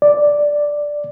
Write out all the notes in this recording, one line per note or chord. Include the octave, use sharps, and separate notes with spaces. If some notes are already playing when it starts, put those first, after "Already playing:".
D5